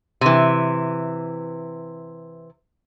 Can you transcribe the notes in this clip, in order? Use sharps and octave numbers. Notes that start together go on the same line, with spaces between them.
C3 E3